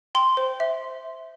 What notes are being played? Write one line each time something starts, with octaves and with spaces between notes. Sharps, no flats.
G5 C6
C5
E5